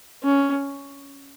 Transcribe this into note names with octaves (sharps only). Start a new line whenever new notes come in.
C#4